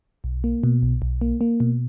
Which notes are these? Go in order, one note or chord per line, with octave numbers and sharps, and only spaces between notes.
B1
A#3
B2
B1
B1
A#3
A#3
B2